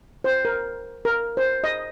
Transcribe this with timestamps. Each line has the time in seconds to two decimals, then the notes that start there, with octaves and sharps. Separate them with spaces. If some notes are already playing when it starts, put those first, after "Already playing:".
0.24 C5
0.45 A#4
1.05 A#4
1.37 C5
1.64 D#5